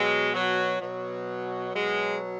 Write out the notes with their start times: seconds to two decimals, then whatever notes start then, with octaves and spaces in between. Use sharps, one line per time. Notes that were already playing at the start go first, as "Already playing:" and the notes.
Already playing: B2 F#3 G#3
0.34 F#3
0.81 B2 F#3
1.74 B2 F#3 G#3